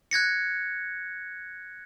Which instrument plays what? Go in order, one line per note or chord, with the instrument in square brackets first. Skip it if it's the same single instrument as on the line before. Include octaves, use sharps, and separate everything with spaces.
[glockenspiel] F#6 G#6 A#6 C#7